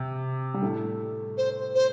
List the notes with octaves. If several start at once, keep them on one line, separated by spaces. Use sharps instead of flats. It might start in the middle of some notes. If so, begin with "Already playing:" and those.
Already playing: C3
G3
A2 A3
C5
C5